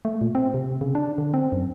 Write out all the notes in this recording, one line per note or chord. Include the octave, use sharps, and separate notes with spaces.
A3
A#2
C4
C3
C#3
D4
D3
C4
F#2